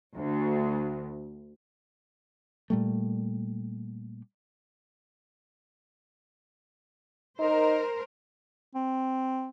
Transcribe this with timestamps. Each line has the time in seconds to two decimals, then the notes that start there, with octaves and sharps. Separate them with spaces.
0.16 D2
2.70 A#2 G3 A3
7.39 D#4 A#4 C5
8.75 C4